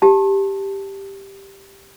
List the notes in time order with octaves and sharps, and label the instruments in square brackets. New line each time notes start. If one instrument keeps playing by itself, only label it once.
[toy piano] G4 A5